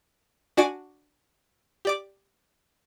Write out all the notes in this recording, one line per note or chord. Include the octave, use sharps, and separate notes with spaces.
D4 F#4 D5 G#5 D7
G4 D5 D6